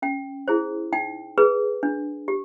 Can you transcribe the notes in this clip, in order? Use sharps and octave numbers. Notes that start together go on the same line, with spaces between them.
C#4 G5
E4 G#4 C5
D#4 G5
G#4 B4
D4
G4